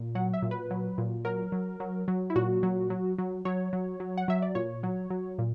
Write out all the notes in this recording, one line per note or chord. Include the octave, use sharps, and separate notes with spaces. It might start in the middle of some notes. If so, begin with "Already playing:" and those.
Already playing: A#2
F#3 F#5
E5
A#2
B4
F#3
A#2
F#3 A#4
F#3
F#3
F#3
E4
A#2 F#4
F#3
F#3
F#3
F#3 C#5
F#3
F#3
F#5
F#3 E5
D5
A#2 C#5
F#3
F#3
A#2